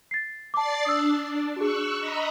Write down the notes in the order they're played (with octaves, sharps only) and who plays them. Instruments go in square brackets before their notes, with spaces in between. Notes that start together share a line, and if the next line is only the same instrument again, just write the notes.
[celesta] A6 C7
[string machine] D5 A6 C7 [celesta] A5 D6
[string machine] D4 [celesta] D#6 E6
[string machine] D4
[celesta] F#4 G#4 [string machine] C#6 E6 F#6
[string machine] D#5 A#5 B5